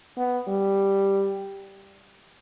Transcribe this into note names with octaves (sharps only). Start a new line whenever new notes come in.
B3
G3